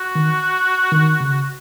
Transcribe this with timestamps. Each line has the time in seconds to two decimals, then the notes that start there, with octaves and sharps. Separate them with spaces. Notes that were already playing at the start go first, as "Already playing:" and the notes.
Already playing: F#4
0.15 D#3
0.92 D#3
1.20 C#3